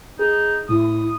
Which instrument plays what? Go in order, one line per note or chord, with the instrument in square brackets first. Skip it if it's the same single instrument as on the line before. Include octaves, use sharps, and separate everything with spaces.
[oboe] D#4 [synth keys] G#4
[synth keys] A2 [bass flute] E4 [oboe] D#6